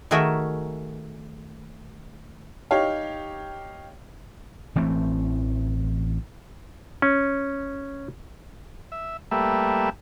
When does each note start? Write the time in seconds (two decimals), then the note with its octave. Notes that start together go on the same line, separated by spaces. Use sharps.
0.11 D#3 A3 F#4 G#4 A#4 E5
2.71 D#4 G4 C#5 F5
4.76 A1 E3 A3 C4
7.02 C#4
8.92 E5
9.31 G3 A3 A#3 B4 E5